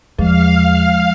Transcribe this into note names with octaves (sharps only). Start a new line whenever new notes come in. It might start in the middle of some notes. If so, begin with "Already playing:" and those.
E2 F3 G#3 F5